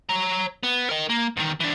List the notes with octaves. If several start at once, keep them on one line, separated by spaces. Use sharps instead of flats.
C#5 A#5
B3
A#4 D#5
A#3
E2 D#3
E3 D4